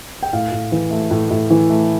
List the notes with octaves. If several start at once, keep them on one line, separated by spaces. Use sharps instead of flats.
G5
A2 F5
A2
E3
A3
A2
A2
E3
A3